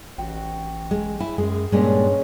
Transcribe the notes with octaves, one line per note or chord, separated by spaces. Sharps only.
A1 F#4 G5
G#3
E4 G#5
F#2 G#3 G#4
G2 A#2 G3 G#3 C#4 D#5